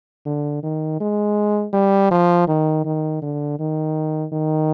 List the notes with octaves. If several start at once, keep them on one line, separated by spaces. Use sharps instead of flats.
D3
D#3
G#3
G3
F3
D#3
D#3
D3
D#3
D#3